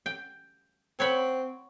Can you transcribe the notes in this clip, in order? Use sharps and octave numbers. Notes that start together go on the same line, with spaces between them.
G5
C4 C#5 F#5 B5